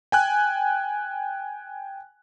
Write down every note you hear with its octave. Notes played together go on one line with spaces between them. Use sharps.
G5 G#5 F#6